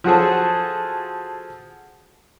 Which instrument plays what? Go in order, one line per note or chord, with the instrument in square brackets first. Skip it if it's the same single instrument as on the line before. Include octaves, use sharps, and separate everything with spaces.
[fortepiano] F3 F#4 G#4 A4